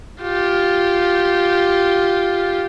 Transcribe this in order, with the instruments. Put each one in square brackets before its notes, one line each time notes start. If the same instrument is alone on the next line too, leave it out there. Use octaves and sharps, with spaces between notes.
[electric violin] F4 G4